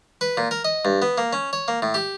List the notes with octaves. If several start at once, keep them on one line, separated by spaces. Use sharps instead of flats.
B4
A#2
A#4
D#5
G2
B3
A#3
C#4
C#5
A#3
A2
G4